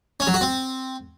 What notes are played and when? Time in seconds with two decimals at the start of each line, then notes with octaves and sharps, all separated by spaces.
0.20 C#4
0.27 F#3
0.34 F#4
0.41 C4